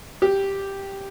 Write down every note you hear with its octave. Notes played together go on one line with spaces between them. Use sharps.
G4